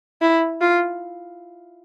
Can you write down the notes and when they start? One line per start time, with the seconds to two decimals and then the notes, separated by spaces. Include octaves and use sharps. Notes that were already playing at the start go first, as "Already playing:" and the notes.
0.22 E4
0.61 F4